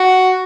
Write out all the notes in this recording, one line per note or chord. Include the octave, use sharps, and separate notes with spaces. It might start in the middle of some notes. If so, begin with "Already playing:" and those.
Already playing: F#4